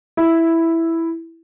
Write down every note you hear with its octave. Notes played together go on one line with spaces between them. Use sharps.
E4